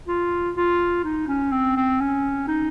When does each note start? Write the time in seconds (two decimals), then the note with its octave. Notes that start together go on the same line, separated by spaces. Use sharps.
0.08 F4
0.56 F4
1.04 D#4
1.28 C#4
1.51 C4
1.76 C4
2.00 C#4
2.48 D#4